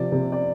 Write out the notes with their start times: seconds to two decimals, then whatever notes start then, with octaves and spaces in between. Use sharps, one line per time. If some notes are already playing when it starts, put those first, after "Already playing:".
Already playing: C3 F3 D5
0.12 C3
0.32 D5